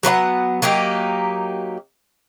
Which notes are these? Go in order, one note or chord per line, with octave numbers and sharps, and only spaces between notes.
F#3 B3 C#5 F#5
F#3 A#3 D#4 G4